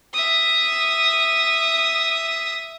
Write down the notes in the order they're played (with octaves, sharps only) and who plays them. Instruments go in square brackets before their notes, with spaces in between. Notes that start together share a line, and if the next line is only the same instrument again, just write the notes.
[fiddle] E5 D#6